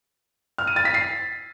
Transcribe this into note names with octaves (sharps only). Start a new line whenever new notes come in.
F6
D#7
A6
B6
C7